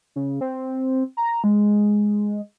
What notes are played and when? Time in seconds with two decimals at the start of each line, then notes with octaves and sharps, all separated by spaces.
0.16 C#3
0.41 C4
1.17 A#5
1.44 G#3